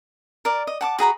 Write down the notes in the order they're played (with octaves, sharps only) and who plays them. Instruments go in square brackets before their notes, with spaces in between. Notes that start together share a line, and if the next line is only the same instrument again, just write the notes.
[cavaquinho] A#4 D5
D#5
F#5 A5 D6
F#4 G#4 A#5 B5